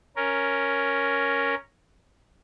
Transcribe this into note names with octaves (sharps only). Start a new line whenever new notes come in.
C#4 A#4